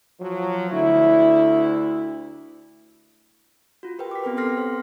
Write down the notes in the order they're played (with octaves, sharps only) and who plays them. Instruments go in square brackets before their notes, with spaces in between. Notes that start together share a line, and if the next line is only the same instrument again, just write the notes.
[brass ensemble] F3 F#3
D2 E4
[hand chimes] F4 F#4
G4 A#4 B4 G5
D6 B6
B3 C4 A#4 B4
A4 G5 C6 F6 A#6 C7
C5